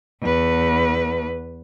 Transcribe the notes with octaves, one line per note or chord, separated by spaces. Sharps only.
E2 B4